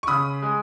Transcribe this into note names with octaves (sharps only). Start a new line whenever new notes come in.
C#6
C#3 B5 D#6
G#3